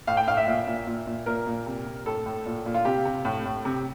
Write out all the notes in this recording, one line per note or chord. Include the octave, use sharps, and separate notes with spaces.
A2 F5
G5
A2 F5
E5
A#2
A#2
A#2
A#2
A#2 A#4
A#2
C3
C3
A2 A4
A2
A#2
A#2
F4
C3 G4
C3
A2
A2
C3